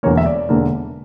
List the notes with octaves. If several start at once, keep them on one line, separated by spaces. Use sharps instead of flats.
E1 E2 D3 A#3 C#5
E5
D5
E1 E2 D3 A#3